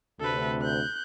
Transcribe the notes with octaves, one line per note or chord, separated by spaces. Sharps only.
D2 C3 A4 B4
F#6 G6